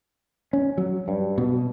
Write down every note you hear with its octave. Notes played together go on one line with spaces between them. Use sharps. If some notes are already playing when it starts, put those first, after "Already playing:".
C#4
F#3
G2
B2